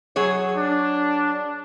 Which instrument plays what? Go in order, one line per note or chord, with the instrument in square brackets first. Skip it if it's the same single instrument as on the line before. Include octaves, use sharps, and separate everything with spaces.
[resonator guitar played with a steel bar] F#3 G#4 C#5
[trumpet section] D4